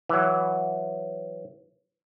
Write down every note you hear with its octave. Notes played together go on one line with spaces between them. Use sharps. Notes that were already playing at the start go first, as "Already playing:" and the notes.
E3 F#3